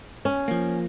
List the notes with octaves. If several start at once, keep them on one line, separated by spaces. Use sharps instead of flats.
C#4
F3 A#3